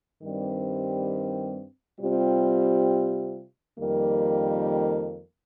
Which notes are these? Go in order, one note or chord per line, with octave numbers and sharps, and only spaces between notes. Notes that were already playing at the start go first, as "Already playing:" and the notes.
G2 D#3 G3 C4
C3 G3 C4 F4
F2 D#3 G3 A#3